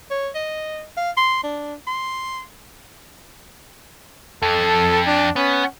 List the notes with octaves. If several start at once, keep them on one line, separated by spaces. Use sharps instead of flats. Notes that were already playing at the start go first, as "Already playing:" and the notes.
C#5
D#5
F5
C6
D4
C6
F2 A4
D4
B3 C#4